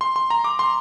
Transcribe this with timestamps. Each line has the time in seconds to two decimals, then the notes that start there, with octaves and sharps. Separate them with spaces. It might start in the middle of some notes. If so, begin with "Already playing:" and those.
0.01 C6
0.16 C6
0.30 A#5
0.44 D6
0.59 C6